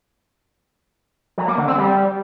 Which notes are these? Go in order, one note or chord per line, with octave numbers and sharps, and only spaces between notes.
F#3
A#3
D3
C4
G3